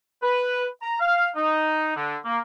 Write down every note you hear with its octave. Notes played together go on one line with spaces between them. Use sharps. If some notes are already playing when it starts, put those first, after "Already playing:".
B4
A#5
F5
D#4
D3
A#3